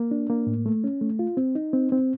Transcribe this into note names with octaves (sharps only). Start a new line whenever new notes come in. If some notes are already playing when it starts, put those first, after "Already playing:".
Already playing: A#3
D4
A#3
A2
A3
C#4
A3
F4
C4
D#4
C4
C4